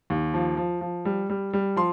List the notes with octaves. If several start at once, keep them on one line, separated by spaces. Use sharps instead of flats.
D#2
F3
F3
F3
G3
G3
G3
F3 C6